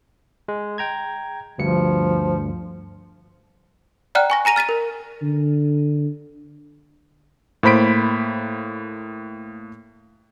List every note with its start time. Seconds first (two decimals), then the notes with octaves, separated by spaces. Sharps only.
0.48 G#3
0.78 G5 A#5 G#6
1.58 D2 G2 F3 C#7
4.15 D5 F#5 G5 A#5 F6 F#6
4.30 G#5 C#6 A#6
4.45 G#5 A#5 A#6 D#7 F7
4.56 F6 A6 B6 D#7
4.69 A#4
5.22 D3
7.63 A2 A#3 C5 B5 B6 D7